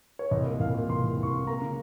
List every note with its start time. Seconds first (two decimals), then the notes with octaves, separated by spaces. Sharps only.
0.19 C#5
0.31 C2 D#5
0.45 A#2
0.60 C2 F5
0.74 A#2
0.89 C2 C6
1.04 C2
1.18 C2
1.23 C#6
1.27 C6
1.32 A#2
1.47 A#3 A#5
1.62 C#3